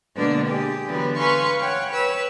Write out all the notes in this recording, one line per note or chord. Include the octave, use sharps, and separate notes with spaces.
B2 D3 G#3 A#3 B3 D4
G4 G#4
D3 E3 F#3 B3
B4 F5 G#5 C6 C#6
C#5 F#5 G5
B4 C#5 E6